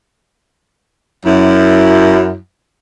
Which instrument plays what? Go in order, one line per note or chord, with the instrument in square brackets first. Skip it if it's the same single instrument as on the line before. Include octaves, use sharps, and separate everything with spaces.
[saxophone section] F#2 E4